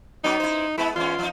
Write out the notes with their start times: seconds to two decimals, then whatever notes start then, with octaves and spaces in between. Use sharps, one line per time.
0.24 F#3 B3 C#4 D#4
0.40 E4 C5
0.78 G#3 B3 E4
0.96 E2 G#2 C#4 F4
1.19 F3 D#4